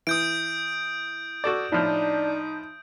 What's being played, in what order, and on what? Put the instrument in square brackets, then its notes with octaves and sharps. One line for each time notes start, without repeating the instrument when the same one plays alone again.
[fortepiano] E3 [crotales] D#6 G6 D7
[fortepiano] F#4 A4 D5
[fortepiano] A2 F3 [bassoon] D4 [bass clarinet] D#4